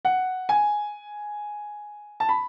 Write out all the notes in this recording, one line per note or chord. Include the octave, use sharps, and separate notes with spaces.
F#5
G#5
A5
B5